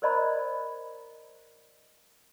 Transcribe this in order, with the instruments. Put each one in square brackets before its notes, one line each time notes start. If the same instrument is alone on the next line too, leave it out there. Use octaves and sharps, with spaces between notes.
[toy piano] A#4 C5 D5 D#5 A#5 B5